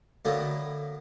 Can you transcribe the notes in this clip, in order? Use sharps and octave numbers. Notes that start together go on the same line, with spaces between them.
A2 D3 F#3 A#3 B3